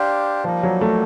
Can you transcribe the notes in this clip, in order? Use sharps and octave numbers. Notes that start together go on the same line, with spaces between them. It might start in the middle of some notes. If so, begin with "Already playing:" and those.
Already playing: D4 G4 C5 F5
F3 G3 A#3 D#4
F#3
A3